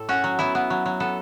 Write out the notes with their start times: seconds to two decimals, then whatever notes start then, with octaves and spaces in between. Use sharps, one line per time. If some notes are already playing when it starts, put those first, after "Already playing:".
Already playing: A2 A4
0.09 C#4 F#4
0.24 F#3
0.39 B3 E4
0.55 B3
0.70 F#3
0.86 F#3
1.00 B3 A4